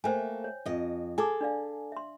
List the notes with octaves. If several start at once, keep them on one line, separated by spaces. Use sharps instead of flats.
A3 A#3 C5 G5 G#5
C#5
F2 D#5
G#4 A4 G#5 D6
D4 D5 F5
E5 C6